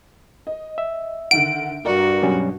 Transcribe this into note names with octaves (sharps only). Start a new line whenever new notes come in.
D#5
E5
D3 D#3 F#5 D7
G2 F#4 A#4 D5
B2 F#3 G3 C#4